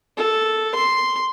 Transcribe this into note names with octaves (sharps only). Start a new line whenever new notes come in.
A4
C6